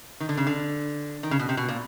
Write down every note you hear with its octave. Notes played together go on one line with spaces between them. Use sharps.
D#3
D3
C#3
D3
D#3
C#3
B2
C3
B2
A#2